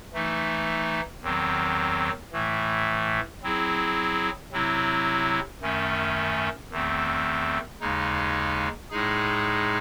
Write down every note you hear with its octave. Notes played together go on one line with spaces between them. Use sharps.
E3 A3 D#4
E2 D#3 F#3 C4
A2 E3 A3
F#3 C4 E4 G#4
C3 F#3 C4 E4
F#2 D#3 A3 C#4
E2 D#3 A3 C4
D#2 C#3 G#3 D#4
A2 G#3 D#4 G#4